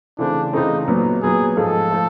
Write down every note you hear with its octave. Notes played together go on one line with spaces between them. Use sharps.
C#3 E3 A3 C4 D4
C#3 E3 A3 C4 D#4
A#2 F#3 B3
A#2 F#3 B3 G#4
G#2 F3 A3 A4
F3 A3